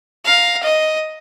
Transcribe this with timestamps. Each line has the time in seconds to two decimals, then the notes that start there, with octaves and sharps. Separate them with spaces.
0.25 F5 A#5
0.63 D#5